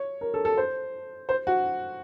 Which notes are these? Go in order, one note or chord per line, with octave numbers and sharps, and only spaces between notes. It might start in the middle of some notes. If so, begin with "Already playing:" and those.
Already playing: C#5
A#4
A4
A4
C5
C5
F#4